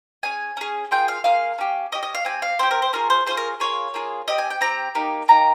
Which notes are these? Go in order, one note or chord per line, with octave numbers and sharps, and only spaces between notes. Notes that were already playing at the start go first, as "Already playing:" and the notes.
C#4 G#4 G#5
C#4 G#4
A#3 F4 G#4 G5
F5
A#3 F4 G#4 F5
C#4 G4
C#4 G4 D#5
D#5
F5
C4 G4 G#5
F5
C4 G4 C5
A#4
C5
C#4 F4 G#4 A#4
C5
C#4 F4 G#4 C5
A#4
A#3 F4 G#4 C#5
A#3 F4 G#4
C4 G4 D#5
G#5
G5
C4 G4 A#5
A#3 D#4 G4
A#3 D#4 G4 A#5